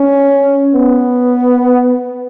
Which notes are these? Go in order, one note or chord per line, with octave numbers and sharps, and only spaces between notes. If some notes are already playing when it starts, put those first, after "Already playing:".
Already playing: C#4
B3